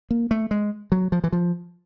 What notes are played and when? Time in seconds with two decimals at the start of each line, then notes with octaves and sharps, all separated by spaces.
0.11 A#3
0.31 A3
0.51 G#3
0.92 F#3
1.12 F3
1.24 E3
1.32 F3